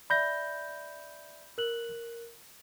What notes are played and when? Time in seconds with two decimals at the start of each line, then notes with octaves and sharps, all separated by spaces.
0.10 D5 E5 B5 G6 A#6
1.58 A#4 F#6 F#7